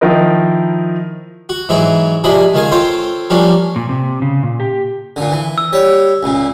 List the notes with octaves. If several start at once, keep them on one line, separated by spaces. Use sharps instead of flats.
D#3 F3 E4 A#4 D#5
F#4
G#2 E3 F#3 D#4 E4 G#4
A#1 C3 D4 G#4 D#5 B5
C#2 D#3 G#4 F5 G#5
C4 F4 A4 C5 C#5
F3 G3 A#3 C#4 D4
A#2
C3
C#3
A#2
G4
A#2 D3
E3
E6
G3 C#5
C#2 A#2